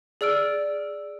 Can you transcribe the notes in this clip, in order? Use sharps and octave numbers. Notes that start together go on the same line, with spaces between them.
G#4 D5 E6 F6 D7